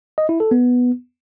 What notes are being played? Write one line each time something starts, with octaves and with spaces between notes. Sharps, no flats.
D#5
E4
A4
B3